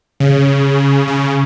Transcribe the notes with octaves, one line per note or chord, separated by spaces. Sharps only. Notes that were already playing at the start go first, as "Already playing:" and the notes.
C#3
C#3